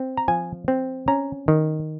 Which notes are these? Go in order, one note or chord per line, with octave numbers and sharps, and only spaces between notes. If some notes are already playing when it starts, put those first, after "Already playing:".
Already playing: C4
A#5
F3 G#5
C4
C#4 A#5
D#3